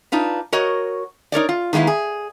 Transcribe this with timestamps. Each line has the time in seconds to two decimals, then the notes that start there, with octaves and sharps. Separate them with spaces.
0.12 D4 D#4 F4 B4
0.52 F#4 A#4 C#5 D#5
1.32 D#4 A#4 C#5 D5
1.49 F4
1.73 D#3 G#3 A#3 B3 E4
1.87 G#4